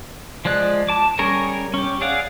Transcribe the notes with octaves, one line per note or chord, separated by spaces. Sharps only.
F3 G#3 D5 F#6
A5 D6
G3 C#4 G#4 A#4 C#5
C#4 G4
G#4 D5 F5 F#5